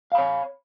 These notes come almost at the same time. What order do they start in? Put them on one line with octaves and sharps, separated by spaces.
F5 B5 C#5